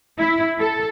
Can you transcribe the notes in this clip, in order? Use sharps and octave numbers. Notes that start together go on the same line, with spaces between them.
E4
A4